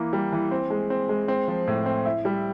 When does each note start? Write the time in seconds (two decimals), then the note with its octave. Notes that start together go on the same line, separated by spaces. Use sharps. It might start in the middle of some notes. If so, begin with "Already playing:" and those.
Already playing: E3 A#3
0.13 G3
0.32 E3
0.51 C4
0.70 G#3
0.90 C4
1.09 G#3
1.28 C4
1.48 F3
1.67 A2
1.86 C4
2.05 E4
2.25 G3